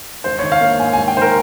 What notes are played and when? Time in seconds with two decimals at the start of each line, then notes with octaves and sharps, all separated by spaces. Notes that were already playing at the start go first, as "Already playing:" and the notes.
0.24 G#1 C5
0.39 D#3 C#5
0.52 F5
0.61 A#3
0.79 G#2 G#5
0.93 G#1 G#5
1.08 G5
1.16 D#3 C5
1.22 A#4